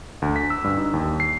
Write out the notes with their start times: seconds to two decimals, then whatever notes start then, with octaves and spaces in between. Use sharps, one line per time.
0.22 D2
0.36 B6
0.50 E6
0.64 G2
0.77 D#4
0.94 D#2
1.20 C7